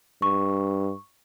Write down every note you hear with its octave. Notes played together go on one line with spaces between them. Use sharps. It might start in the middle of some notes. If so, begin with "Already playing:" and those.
G2 C#6